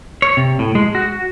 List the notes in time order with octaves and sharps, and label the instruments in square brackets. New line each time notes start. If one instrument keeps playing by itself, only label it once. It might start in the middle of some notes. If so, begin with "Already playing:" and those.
[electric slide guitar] C#5
C3
A2
G#3
F#4